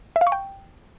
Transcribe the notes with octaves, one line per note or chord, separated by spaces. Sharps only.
E5
F5
C#6
G5